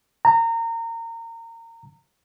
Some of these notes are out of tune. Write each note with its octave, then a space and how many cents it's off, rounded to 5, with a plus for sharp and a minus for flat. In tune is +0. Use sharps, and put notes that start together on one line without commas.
A#5 -25